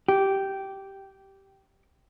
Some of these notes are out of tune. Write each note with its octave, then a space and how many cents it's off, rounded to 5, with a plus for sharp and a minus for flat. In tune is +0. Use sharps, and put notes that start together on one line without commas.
G4 -10